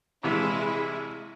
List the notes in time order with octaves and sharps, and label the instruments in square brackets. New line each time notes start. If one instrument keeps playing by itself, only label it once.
[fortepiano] A#1 C3 E3 [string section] G#3 E4